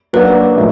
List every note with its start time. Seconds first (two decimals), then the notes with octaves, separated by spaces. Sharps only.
0.13 F#3 A#3 D4 F#4 B4
0.56 A2 F3 G#3 C#4